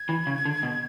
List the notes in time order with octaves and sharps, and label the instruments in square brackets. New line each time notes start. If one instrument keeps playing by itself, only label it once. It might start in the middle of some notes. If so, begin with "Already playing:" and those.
Already playing: [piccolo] G#6
[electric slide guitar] E3
C#3
D3
B2